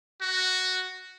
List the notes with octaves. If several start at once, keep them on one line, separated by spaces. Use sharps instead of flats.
F#4